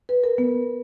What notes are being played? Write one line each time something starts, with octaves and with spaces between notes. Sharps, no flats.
B4
A#4
B3